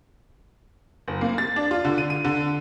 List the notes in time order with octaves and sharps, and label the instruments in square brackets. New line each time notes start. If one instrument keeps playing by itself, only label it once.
[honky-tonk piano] F#1
A#3
A6
D4
F4
D3
D#7
D#7
D3